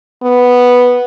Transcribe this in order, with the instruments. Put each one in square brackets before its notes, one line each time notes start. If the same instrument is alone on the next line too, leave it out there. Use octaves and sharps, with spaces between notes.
[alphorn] B3